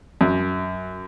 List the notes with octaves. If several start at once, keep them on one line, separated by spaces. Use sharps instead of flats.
F#2